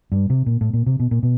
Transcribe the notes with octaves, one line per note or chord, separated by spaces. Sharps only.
G2
C3
A#2
A2
A#2
C3
B2
A#2
B2